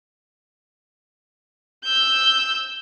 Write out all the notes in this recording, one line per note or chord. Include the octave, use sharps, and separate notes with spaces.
E6 G6